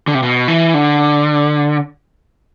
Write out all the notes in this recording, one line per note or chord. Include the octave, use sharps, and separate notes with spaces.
D3
C3
B2
E3
D3